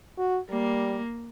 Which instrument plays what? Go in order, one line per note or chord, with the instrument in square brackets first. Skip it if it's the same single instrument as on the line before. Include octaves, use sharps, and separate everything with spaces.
[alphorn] F#4
[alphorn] G3 [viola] A#3